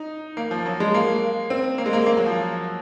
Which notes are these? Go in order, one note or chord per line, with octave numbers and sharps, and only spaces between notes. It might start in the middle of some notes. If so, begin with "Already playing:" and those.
Already playing: D#4
A#3
F3
F#3
G#3
A#3
C4
A#3
G#3
A#3
A#3
F#3
F3